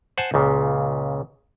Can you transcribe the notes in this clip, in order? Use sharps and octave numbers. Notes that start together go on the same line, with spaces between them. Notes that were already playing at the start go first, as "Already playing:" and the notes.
C5 F#5 G#5 A5
C#2 A#2 C#3